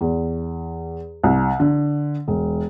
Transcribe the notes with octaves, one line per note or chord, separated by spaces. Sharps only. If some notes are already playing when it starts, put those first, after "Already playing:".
E2
C2
D3
E1